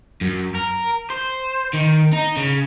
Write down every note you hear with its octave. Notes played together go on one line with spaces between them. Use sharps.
F#2
A#4
C5
D#3
D#4
C#3